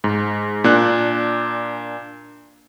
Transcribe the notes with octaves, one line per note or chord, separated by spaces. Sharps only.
G#2
A#2 D4 F#6